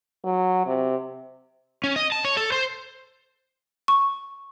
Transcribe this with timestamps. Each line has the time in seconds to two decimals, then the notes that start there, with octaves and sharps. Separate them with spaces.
0.24 F#3
0.67 C3
1.84 C#4
1.96 D#5
2.12 A5
2.25 C#5
2.37 A4
2.52 C5
3.88 C#6